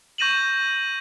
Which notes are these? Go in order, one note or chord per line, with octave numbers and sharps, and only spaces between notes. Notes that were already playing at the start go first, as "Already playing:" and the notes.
C#6 G6 A#6 D#7 E7 F#7